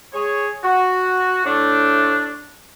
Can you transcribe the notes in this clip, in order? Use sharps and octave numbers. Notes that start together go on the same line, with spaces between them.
G#4 C#5
F#4
A2 A3 D4